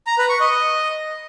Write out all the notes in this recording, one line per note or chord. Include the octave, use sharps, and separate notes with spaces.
A#5
B4
C#6
D#5